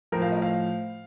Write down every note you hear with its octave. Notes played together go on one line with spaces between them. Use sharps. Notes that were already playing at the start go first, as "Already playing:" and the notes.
A2 F3 A#4
F5
D#5
F5